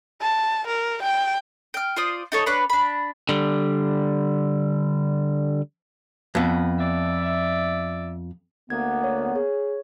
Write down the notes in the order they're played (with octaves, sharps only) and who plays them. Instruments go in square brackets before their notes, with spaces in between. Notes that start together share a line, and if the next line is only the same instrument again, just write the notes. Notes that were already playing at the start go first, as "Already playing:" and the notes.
[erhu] A5
A#4
G5
[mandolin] G5 F6
F4 C5 D5 D#6
D#4 A4 C#5
D4 B4 C#5 B5
D4 B5
[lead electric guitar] D3 G3
[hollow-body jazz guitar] F2 B3
[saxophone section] D5 E5
[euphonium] D2 [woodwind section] A#3 B3 [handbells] G#6
[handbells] C#5
[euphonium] G#4 [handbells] C#5